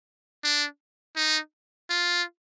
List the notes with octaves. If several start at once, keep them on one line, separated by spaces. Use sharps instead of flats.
D4
D#4
F4